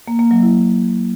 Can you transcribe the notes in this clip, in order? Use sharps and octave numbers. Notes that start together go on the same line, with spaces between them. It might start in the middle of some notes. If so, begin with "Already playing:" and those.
A#3
A#3
F#3
E4